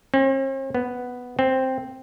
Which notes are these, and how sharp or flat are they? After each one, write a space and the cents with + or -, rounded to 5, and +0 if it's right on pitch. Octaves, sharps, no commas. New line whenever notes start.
C4 +45
B3 +0
C4 +0